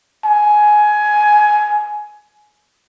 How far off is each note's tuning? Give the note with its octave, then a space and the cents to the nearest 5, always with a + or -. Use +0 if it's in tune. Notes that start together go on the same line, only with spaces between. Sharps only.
G#5 +15